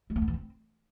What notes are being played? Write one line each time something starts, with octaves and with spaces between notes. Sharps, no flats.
G#3
A#3
B3
E3
C4